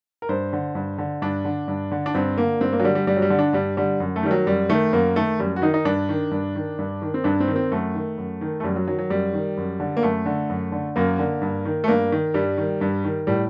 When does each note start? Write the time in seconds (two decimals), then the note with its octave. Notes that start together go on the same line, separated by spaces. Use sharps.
0.22 A#4
0.29 G2 C5
0.53 D3
0.75 G2
0.98 D3
1.22 G2 D4
1.45 D3
1.68 G2
1.91 D3
2.06 D4
2.15 G2 C4
2.38 D3 A#3
2.61 G2 C4
2.73 A#3
2.80 F#3
2.83 D3 G3
2.95 G3
3.07 G2 G3
3.16 F#3
3.22 G3
3.30 D3
3.39 D4
3.53 G2 G3
3.77 D3 G3
4.00 F#2
4.16 A3
4.23 D#3 G3
4.31 F#3
4.46 F#2 G3
4.69 D#3 A3
4.93 F#2 A#3
5.16 D#3 A3
5.39 F#2 G3
5.56 F#4
5.62 D#3 D#4
5.74 D#4
5.85 G2 D4
6.09 D#3
6.31 G2
6.55 D#3
6.79 G2
7.02 D#3
7.14 C4
7.24 G2 D4
7.40 C4
7.48 D#3
7.56 C4
7.72 F#2 A3
7.94 D#3
8.18 F#2
8.41 D#3
8.60 A3
8.63 F#2 G3
8.76 F#3
8.88 D#3 F#3
8.99 F#3
9.10 F#2 G3
9.33 D#3
9.57 F#2
9.80 D3
9.97 A#3
10.03 F#2 A3
10.26 D3
10.49 F#2
10.72 D3
10.96 F#2 A#3
11.19 D3
11.42 G2
11.65 D#3
11.84 A3
11.88 G2 A#3
12.12 D#3
12.34 G2 G3
12.58 D#3
12.81 G2
13.04 D#3
13.27 A2 G3